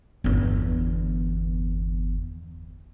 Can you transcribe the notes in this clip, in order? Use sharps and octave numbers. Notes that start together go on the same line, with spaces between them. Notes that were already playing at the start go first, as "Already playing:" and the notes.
G1 E2